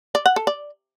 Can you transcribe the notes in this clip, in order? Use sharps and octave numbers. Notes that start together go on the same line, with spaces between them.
D5
F#5
A4
D5